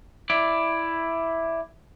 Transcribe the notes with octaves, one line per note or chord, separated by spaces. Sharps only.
E4 D5